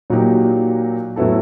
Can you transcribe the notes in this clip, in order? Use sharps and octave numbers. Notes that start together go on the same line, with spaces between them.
A#2 F#3 A#3 D#4 G4
A2 F#3 B3 E4 A4